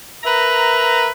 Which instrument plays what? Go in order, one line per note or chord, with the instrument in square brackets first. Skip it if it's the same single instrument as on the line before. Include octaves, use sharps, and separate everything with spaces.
[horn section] A#4 B4 E5 A#5